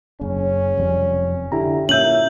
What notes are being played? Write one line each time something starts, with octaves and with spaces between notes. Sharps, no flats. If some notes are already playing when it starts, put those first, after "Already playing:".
F#1 C#3 C#4
F1 F2 G3
D3 E4 G4 A#5
A#2 C#4 E5 G6 F#7